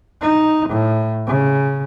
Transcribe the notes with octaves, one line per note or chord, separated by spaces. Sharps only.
D#4
A2
C#3